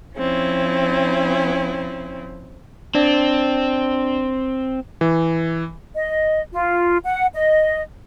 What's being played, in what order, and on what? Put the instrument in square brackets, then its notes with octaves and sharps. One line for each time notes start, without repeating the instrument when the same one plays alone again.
[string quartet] F3 C4 C#4 E4
[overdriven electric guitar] C4 [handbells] D4 D5
[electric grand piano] E3
[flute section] D#5
F4
F#5
D#5